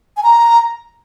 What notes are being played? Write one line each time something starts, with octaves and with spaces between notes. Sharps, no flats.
G#5
A#5